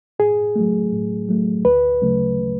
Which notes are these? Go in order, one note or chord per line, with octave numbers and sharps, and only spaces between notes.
A2 G#4
F#3 A3
A2
F#3 A3
D2 B4
C#3 F#3 A3